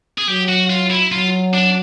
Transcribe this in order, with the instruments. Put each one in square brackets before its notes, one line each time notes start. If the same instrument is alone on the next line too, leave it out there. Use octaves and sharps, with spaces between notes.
[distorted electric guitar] G#4
[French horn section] F#3 [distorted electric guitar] G4
[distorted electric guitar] F#4
F4
E4
[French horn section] F#3 [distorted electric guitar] F4
[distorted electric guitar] D4